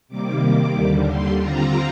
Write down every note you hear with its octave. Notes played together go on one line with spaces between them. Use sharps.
C3 D#3 G3 A#3 D6
D#2 D3 G3
C6
D3 G3 C4 F4 A#5